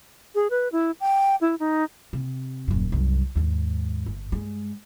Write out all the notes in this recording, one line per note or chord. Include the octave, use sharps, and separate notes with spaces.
G#4
B4
E4
G5
E4
D#4
C3
D#1 F#2
C2 F#2
D#2 G#2
G1
G2 G#3